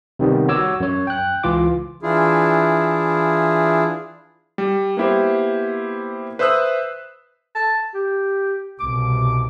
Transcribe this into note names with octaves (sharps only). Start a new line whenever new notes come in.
C3 D#3 G3 B3
F#4 C#5 D6 E6
F#2 C#5
G5 F#6
C#2 E3 F4 D6
E3 D4 E4 F4 G#4
G3
A#3 B3 E4 G4 C5
B4 C5 E5 D#6 E6 F#6
A5
G4
C2 B2 D6